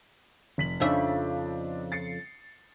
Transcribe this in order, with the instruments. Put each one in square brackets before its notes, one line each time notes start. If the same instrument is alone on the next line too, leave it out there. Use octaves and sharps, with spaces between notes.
[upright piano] F1 B6 F#7
[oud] F2 C#3 E5 [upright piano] D4 D#4
[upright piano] A6 C7 C#7